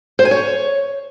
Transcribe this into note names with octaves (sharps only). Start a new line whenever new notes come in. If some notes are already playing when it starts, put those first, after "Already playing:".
C5
G#5
C#5